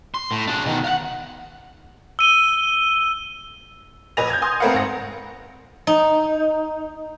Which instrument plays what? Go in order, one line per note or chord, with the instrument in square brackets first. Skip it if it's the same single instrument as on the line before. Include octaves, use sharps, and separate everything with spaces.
[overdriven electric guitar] C6
A2
D4 G#4
B2 D#3
F5 F#5
[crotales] E6 D#7 G7
[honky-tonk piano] A#1 B4 D#5 G#5 A#6 F7
G6 G#6
G#5 C6 D#6
A3 C4 A#4 B4 F5 F#5
G#1 F#5 A#6
[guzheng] D#4